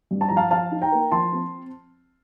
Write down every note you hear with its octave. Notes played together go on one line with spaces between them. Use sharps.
G2
A5
F3 A#5
F5 A5
F3 F5 A5
D#4
G5 A#5
A#3
F3 A5 C6
C4